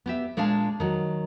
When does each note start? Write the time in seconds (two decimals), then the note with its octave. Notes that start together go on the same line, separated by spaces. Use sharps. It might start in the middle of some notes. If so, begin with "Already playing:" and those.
0.06 B3 G4 E5
0.37 A#2 G#3 D4 G#4 F5 A5
0.80 D#3 F#3